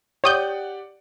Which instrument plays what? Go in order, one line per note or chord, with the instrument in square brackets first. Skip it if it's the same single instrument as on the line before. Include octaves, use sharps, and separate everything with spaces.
[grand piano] G4 D5 F#5 [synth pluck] C#5 D#6 G6